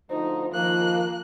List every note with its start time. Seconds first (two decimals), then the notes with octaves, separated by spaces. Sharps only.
0.10 D2 F3 D#4 C5
0.53 D#3 F3 A#3 F#6